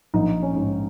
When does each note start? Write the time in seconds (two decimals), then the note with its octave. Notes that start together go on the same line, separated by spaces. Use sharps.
0.14 A#1 D#4
0.43 C#4
0.56 G#2